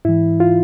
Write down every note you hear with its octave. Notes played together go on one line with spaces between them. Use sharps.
G#2 E3 E4
F4